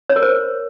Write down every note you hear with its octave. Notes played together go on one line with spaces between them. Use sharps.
C#5
A#4
C5